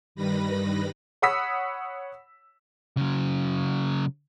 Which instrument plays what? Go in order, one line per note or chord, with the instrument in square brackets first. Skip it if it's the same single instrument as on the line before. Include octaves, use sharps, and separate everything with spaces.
[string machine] G2 D#3 G3 B4 B5 A#6
[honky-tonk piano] C#5 F#5 B5 D#6 E6 B6
[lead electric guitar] C#3 F#3